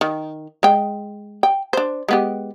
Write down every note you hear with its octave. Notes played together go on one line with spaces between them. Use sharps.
D#3
G#3 G5
G5
D4 C5
G#3 B3 G4